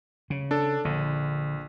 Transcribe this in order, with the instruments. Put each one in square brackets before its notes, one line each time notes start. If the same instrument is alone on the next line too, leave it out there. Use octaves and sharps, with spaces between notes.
[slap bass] C#3
[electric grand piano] D4 A4
[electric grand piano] A#1 [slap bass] D3